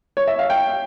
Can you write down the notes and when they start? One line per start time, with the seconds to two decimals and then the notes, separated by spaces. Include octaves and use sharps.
0.17 C#5
0.27 E5
0.39 F5
0.50 G5